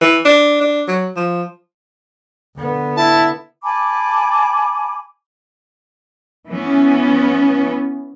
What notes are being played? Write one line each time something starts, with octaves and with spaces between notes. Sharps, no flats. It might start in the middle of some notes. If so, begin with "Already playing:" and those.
E3
D4
D4
F#3
F3
D3 B3
E4 A5
G#5 A5 B5 D6
E3 B3 C#4